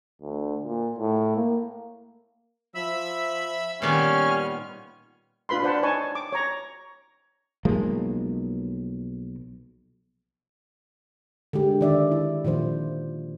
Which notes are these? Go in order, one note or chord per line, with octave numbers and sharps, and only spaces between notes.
D2
A#2
A2
A#3
F3 E5 B5 E6
A#2 D#3 G3 B3 C#4 F6
D4 F4 B4 B5 C6
F4 B4 C5 D5 F#5 A5
D#4 C#5 G#5 A5 C#6
D6
C#5 A#5
B1 F3 G#3 A#3
D3 G#3 G4
D#3 D5 E5
E4
A#2 D#3 F3 C5